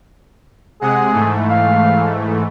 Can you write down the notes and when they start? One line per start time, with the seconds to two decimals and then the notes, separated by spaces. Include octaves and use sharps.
0.81 C3 G#3 G#4 F#5
1.12 G#2 E3 A3
1.50 F5